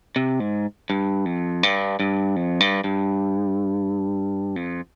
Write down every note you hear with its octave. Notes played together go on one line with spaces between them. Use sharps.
C3
G#2
G2
F2
G2
G2
F2
G2
G2
F2